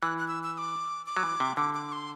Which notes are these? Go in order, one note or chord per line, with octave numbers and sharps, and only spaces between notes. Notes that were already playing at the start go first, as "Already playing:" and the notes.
E3 F#6
F#6
E6
E6
E6
D6
D6
F#3
E3
C3
D3 D6
D6
C6